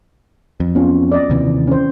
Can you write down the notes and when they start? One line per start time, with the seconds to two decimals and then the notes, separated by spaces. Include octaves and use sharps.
0.60 F2
0.75 B3 C#4 F4
1.12 D5 D#5
1.30 D#2 C3 E3
1.67 C#4 C5